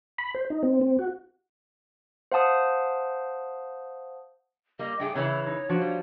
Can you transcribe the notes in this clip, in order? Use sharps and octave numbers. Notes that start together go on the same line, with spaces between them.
B5
C5
D#4
C4
C4
F#4
C5 F5 F#5 A5 D#6
G3 A#3 D#5
G2 A3 G#4 G5
C#3 E3 E4 C#5
D#4
F3 D4 F#4
G3